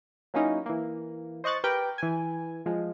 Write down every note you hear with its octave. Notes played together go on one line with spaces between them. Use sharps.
F#3 A#3 C#4 D#4 E4
E3 A#3
C5 D#5 C#6 F#6 A6
G4 A#4 B4 G5
E3 G#5
F3 G#3